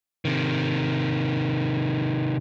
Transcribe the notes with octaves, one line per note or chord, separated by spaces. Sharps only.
C3 D#3